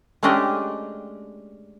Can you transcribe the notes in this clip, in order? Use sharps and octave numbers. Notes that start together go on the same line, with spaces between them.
G#3 A3 C#4 D4 G4 D#5